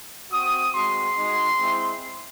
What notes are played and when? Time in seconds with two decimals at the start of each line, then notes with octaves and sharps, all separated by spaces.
0.31 C4 F#4 D#6
0.74 G#3 C4 F#4 C6
1.17 G#3 D#4 F#4
1.59 G#3 C4 E4